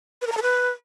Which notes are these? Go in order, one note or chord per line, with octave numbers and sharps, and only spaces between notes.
B4
A#4
A#5
A4
B4